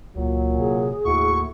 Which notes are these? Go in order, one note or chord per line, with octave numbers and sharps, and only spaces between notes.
C#2 A#2 F#3
C3 G#4
D#2 A2 E4 F#4 C#6